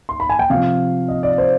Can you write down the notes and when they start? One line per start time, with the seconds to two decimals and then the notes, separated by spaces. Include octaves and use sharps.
0.09 C6
0.20 B5
0.29 G#5
0.39 G5
0.50 C3 F3 F5
1.08 D#5
1.23 D5
1.38 C5